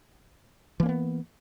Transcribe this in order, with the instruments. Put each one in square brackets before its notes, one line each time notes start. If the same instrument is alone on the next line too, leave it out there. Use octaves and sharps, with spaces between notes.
[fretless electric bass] E3
A#3
C#4
B3